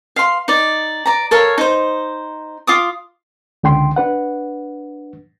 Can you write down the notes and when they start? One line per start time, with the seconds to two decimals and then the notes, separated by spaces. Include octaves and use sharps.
0.16 F5 C6
0.48 D#4 D5
1.06 D5 A#5
1.31 A4 A#4 C#5 F5
1.58 D#4 C5
2.67 F4 D6 D#6
3.63 C#2 D3 G5 C6
3.96 D4 B4 F#5